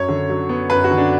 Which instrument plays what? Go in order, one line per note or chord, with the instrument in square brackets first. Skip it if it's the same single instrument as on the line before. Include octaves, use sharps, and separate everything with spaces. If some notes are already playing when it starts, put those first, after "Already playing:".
Already playing: [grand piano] F#2 C#5
D3
F#3
B3
F#2 B4
F#4
D3
D4